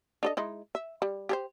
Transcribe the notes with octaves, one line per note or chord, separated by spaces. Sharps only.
D4 A4 D#5
G#3 D#4 E4
E5
G3
G4 G#4 C5